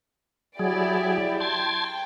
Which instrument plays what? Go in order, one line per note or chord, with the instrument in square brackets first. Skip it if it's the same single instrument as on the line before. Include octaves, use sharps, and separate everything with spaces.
[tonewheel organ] F#3 G#4 [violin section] E4 G4 D5
[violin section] G5 [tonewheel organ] A5 C6 G#6